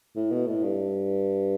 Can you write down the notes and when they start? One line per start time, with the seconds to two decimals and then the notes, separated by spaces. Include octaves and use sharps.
0.16 A2
0.31 B2
0.47 A2
0.63 G2